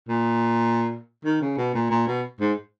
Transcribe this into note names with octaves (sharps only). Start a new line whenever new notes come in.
A#2
D#3
C#3
B2
A#2
A#2
B2
G#2